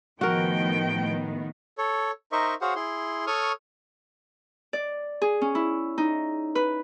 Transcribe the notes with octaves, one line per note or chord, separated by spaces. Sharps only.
A2 D#3 F3 B3 F#4 A#4 G5
A4 C#5
D#4 A#4 C5 D#5 E5 C#6
F#4 G#4 C5 C#5 F5 F#5
E4 G#4 C6
A4 C#5 C#6 D#6 F6
D5
G#4
C#4
E4
D#4
B4